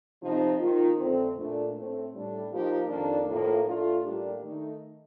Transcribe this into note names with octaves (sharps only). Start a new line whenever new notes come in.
C3 F3 C4 D#4
D#3 A#3 F4
F2 D3 A3 C4
A#2 A3 D4
A2 A3 C4
A2 G3 D4
F3 A#3 D#4 G4
F2 D#3 A#3 D4
A2 F3 A#3
A2 A3 D4 F4
A2 G3 A#3 D4 G4
D#3 A3 D#4